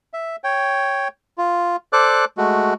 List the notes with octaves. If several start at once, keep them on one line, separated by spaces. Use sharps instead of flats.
E5
C#5 G5
F4
A4 C5 D5 D6 F#6
G#3 A3 F#4